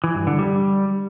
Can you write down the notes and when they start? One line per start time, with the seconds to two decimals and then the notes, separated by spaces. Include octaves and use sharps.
0.04 E3
0.15 G2
0.27 D3
0.39 G3